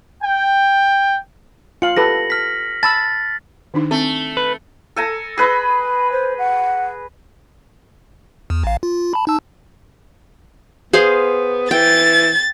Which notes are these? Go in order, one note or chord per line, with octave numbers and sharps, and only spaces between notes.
G5
F4 F5 C#7 F#7
G4 A4 B4 A#6
F6 B6
A5 B5 E6 A6
D#3 D4 D#4
A3 C4
B4
A4 G#5 A#5
G#4 B4 D#5 B5
C5
F#5
E2
A1 F5
F4
A5 B5
D#4 A5 E6
B3 G#4 C5 F5
E3 G5 A6